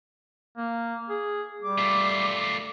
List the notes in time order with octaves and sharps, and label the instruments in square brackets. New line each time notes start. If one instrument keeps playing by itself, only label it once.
[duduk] A#3
G#4
[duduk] G3 [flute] D6
[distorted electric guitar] A3 F4